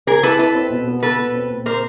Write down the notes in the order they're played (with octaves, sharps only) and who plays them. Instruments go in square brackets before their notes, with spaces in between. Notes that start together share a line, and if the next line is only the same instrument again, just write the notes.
[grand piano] C4 [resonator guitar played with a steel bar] G#4 A#4
[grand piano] E4 [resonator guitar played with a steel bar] A4 B4
[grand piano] E4 [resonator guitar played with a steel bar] A4 B4
[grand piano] C4
B2
B3
[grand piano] B3 [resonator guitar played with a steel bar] A4 B4
[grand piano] B2
C4
A#2
[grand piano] A#2 [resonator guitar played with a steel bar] A#4 C5